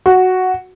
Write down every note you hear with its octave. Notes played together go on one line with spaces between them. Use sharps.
F#4